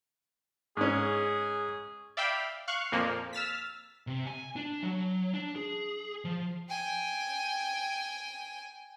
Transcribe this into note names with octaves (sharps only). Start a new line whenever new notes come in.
G#2 C#4 G#4
D5 E5 F5 G5 B5
F5 C#6 F#6
F2 A#2 F3 A#3
E6 F6 A6 B6
C3
G#5
D4
F#3
D4
G#4
F3
G5 G#5